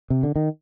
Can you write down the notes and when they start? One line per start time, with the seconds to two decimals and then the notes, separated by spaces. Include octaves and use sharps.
0.10 C3
0.23 D3
0.36 D#3